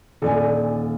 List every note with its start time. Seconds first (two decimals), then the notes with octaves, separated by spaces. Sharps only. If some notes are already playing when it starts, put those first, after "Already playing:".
0.22 D#1 A4 D5 G#5